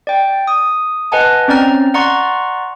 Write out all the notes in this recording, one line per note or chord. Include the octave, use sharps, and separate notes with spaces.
D5 G5
D#6
B4 D#5 F#5 G#5 A5
C4 C#4 D5 A#5 F6
D5 F#5 A#5 C6 C#6